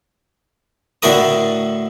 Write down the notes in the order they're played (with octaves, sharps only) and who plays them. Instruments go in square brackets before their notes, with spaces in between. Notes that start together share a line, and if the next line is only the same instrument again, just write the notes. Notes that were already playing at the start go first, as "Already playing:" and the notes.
[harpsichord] A2 D3 E4 F#4 A#4 D#6